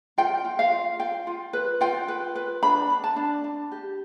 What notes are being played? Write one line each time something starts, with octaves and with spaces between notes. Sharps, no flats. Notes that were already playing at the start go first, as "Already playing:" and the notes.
F4 G5
F4
F5
F4
F4 G5
F4
B4
F4 G5
B4
B4
D4 B5
D4
A5
D4
D4
G4